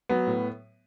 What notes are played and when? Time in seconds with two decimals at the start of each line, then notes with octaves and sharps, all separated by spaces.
0.09 F#3 B3
0.27 A2